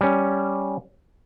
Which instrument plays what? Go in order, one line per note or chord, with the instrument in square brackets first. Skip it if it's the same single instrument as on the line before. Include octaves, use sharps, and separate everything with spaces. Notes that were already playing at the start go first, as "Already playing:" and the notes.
[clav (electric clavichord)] G3 C#4